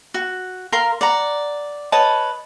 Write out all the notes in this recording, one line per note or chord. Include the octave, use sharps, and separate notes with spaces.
F#4
A#4 F5 A#5 C6
D5 F#5 A#5
B4 C#5 D#5 A5